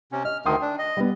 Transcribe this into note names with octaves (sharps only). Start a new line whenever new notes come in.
C3 C#4
D#5 F6
D2 D#3 G5 C6 D#6
D4
D#5
G3 B3